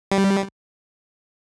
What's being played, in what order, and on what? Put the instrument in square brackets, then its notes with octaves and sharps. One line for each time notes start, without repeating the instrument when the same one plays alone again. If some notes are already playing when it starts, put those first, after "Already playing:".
[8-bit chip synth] G3